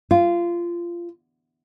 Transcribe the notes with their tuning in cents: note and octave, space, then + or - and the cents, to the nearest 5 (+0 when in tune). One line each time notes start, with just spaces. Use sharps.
F4 -20